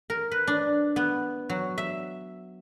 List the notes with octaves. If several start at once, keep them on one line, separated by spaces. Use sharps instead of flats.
A#4
B4
D4
B3
F#3
E5